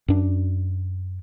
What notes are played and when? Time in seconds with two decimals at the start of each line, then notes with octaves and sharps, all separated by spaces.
0.08 F#2 D4